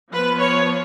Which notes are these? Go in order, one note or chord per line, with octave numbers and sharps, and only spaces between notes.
F3 B3 B4
C#5